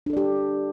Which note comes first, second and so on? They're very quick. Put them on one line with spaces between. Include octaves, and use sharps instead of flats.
D4 A4 D5 G4